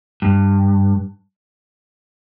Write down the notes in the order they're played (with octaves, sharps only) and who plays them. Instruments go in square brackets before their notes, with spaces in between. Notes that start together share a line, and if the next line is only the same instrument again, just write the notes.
[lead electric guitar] G2